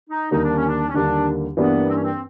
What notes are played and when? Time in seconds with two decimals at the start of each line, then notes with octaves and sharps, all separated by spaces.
0.10 D#4
0.31 D#2 D3 G3 A#3 D#4
0.43 D4
0.56 C#4
0.68 D4
0.89 C#4
0.94 D#2 D3 G3 A#3 D4
1.57 G2 E3 G3 A#3 B3 D4
1.88 C4
1.96 C#4
2.04 C4